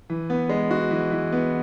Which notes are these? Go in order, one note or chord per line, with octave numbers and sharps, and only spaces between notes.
E3
B3
G#3
F#4
E3
E3
B3